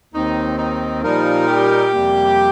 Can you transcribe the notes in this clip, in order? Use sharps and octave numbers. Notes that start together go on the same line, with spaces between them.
D#2 D#3 C4 D#4
D#4
A#2 F3 G3 D#4 A#4
G4
F2 C3 G3 A#3